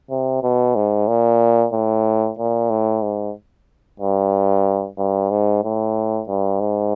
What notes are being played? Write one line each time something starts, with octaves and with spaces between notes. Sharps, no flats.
C3
B2
G#2
A#2
A2
A#2
A2
G#2
G2
G2
G#2
A2
G2
G#2